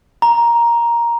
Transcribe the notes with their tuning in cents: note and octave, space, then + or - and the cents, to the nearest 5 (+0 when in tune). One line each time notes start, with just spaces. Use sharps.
A#5 +10